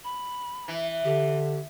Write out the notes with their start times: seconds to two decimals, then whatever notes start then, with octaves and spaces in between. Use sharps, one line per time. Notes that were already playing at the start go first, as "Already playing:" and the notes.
0.04 B5
0.68 E3
1.04 D3 G4